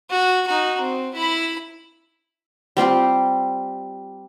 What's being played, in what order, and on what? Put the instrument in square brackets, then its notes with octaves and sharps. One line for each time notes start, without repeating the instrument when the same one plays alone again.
[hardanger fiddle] F#4
D#4 F#4
C4
E4 B5
[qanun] G3 C4 F4 G4